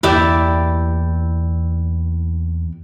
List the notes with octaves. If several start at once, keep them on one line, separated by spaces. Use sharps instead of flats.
E2 A#3 E4 G4 D5